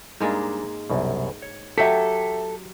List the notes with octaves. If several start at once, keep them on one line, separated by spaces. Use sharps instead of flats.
G#2 G3 G#3 A#3 D4
C2 F#2 B2
C#5
F#3 G4 A4 E5 G5 B6